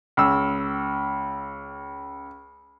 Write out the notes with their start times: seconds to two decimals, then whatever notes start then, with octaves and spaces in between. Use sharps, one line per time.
0.17 C#2 E6